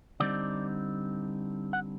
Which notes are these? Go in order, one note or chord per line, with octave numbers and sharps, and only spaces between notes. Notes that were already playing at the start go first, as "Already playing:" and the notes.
D3 G3 C4 D#4 D5
F#5